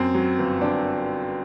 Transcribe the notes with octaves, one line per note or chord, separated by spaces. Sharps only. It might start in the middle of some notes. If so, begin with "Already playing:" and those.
Already playing: F#2 C4
F#3
G1
G1 D4